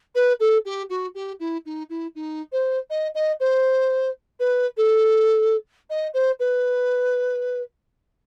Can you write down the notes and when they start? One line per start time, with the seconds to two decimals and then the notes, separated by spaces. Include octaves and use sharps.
0.15 B4
0.40 A4
0.65 G4
0.90 F#4
1.15 G4
1.40 E4
1.65 D#4
1.89 E4
2.15 D#4
2.52 C5
2.90 D#5
3.15 D#5
3.40 C5
4.40 B4
4.77 A4
5.90 D#5
6.14 C5
6.40 B4